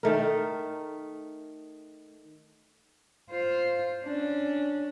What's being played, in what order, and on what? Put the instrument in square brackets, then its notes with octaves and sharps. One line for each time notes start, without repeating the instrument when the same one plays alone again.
[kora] D#3 A3 A#4
[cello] F4 C5
C#4 D4